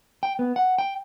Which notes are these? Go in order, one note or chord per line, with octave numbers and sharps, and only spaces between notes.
G5
B3
F#5
G5